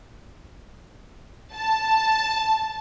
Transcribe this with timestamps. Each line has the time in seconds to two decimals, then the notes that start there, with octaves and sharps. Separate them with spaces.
1.55 A5